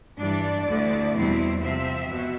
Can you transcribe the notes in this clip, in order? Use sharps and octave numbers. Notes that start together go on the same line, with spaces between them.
G2 E3 G3 D4 D5
D2 D3 A3 E4
E2 B2 G3 C4 E4
C3 F3 C4 E5
B2